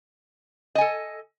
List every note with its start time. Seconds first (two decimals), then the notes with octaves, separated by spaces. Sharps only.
0.75 D#5
0.78 G#5
0.81 A4